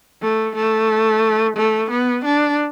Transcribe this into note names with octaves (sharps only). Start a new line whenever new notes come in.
A3
A3
A3
B3
D4